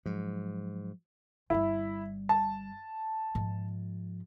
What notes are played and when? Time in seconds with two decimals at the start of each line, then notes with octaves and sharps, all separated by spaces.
0.06 G#2 F3 F#3
1.50 G1 G3 E4
2.29 A5
3.35 G#2 F3